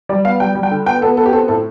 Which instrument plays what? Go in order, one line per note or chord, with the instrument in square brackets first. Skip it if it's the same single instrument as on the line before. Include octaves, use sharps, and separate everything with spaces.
[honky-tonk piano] G3 D5
B3 F5
G3 G5
G3
G5
D3
B3 G5
B3 A4
B3 A4
G4
C4 A4
A2 A4